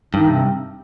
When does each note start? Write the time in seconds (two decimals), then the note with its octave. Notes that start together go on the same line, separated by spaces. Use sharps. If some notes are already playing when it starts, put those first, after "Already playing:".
0.14 G2 D#3 D#4
0.29 C3 C4